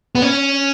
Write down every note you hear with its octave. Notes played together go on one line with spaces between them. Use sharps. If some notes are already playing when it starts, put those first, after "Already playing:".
B3
C#4